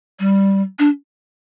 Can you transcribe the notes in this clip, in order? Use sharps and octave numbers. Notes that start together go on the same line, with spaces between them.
G3
D4